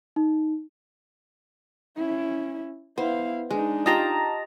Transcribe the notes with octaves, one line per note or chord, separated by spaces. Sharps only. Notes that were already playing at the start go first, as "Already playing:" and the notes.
D#4
C#4 E4
B3 E4 C5 F5
G#3 D4 D#4
F4 G4 D#5 G5 A5 A#5